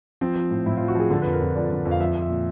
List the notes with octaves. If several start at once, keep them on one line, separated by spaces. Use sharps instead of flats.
F3 C4
F3
A2
A2 E4
F4
F3
F#4
F3 G#4
D3 A4
B4
F2
A#4
F2
F3 D5
D3
F2
F5
F3 E5
F3
E5
A#2